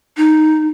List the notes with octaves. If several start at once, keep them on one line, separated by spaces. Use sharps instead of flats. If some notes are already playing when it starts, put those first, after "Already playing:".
D#4